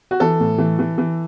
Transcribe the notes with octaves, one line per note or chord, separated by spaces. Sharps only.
F#4
E3 A4
A2
E3
E3
E3